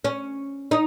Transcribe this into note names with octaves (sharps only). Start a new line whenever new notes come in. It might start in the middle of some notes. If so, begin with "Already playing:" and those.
C#4
D#4